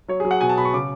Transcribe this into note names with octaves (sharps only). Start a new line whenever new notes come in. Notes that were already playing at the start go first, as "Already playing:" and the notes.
F#3 C#5
G#4
F#3
F#5
B2 G#5
A5
B2 B5
C#6
C#3 D6